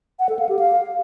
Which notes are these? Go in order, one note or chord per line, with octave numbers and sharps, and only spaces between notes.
F#5
A4
F5
G4
F5